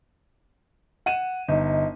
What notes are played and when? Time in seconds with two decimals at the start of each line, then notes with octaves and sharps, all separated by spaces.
1.06 F#5 D#7 E7
1.49 G1 D#4 D#5